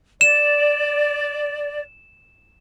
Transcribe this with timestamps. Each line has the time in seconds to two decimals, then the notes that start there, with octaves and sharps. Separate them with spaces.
0.21 D5 E7